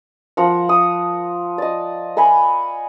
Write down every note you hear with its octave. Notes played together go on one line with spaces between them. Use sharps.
F3 A#4 F#5
D#6
D5 D#5
A#4 F#5 G#5 B5